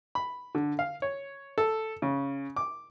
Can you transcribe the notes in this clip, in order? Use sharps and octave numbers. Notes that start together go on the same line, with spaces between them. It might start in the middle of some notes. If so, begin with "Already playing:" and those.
B5
D3
F5
C#5
A4
C#3
D6